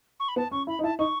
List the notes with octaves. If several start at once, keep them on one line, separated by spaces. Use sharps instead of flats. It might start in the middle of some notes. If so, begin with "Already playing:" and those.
C#6
B5
B3 A5
C#4 C#6
E4 B5
D#4
E4 A5
D#4 C#6